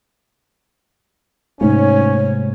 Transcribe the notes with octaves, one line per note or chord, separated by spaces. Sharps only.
G#2 C3 A3 A#3 C#4 C#5